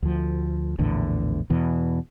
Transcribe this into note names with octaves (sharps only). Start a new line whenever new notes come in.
D2 F3
A#1 E2 A2 D3
E2 B2 E3